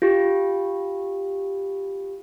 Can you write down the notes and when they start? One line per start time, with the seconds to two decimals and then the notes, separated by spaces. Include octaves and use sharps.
0.02 F4 G4